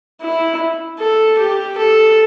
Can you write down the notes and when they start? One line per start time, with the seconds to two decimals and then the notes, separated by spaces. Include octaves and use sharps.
0.21 E4
0.99 A4
1.38 G4
1.78 A4